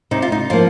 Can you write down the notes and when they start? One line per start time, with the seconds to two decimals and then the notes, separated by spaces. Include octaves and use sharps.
0.11 C3 D#4
0.22 F4
0.32 D#4
0.50 F3 A#3 F4